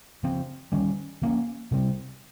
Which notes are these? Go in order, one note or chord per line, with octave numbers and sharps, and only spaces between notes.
C#3 F3 C4
D#3 G3 C#4
F3 A#3 C#4
C3 G3 C4